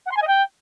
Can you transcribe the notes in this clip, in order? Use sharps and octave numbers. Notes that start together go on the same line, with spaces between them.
F#5
C6
G#5
D#5
G5